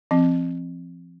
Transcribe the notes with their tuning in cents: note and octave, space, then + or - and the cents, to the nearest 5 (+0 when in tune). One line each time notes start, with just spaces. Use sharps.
F3 -30 C4 +0